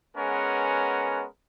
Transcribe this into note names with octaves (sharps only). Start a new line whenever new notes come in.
G#3 B3 C#4 A#4 B4 F#5